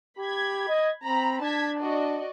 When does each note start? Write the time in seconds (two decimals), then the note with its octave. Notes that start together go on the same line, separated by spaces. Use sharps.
0.19 G4 B5 G#6
0.68 D#5
1.04 C4 A#5 B5
1.41 D4 A5 G#6 B6
1.80 F#4 D5 D#5